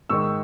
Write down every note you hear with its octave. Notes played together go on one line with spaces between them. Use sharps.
G#2 D#3 G#3 D#4 C#6 E6